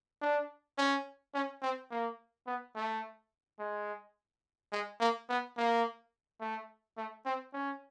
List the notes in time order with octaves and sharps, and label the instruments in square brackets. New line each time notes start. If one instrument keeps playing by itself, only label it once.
[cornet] D4
C#4
C#4
C4
A#3
B3
A3
G#3
G#3
A#3
B3
A#3
A3
A3
C4
C#4